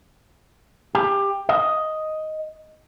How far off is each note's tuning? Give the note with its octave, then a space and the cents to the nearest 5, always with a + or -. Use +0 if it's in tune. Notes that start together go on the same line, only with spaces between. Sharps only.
G4 +20
D#5 +5